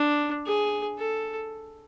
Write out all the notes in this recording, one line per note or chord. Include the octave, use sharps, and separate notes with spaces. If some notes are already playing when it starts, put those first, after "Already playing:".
Already playing: D4
G#4
A4